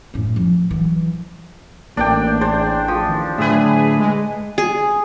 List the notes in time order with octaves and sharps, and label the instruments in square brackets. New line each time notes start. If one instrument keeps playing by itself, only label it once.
[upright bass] A2 C#4
F3
E3 F#3
[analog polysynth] A1 [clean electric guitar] A#3 [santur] D4 D5 G5
[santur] D4 C5 [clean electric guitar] G#4
[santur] F3
[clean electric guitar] D#2
[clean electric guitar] A2 D3 [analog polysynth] G#4 [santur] B4 E5
[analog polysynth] G#3
[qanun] G#4